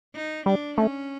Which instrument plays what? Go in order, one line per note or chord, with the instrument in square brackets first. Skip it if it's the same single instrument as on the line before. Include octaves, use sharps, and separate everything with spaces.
[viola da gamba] D#4
[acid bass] G3 [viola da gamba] D4
[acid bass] A3 [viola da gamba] C#4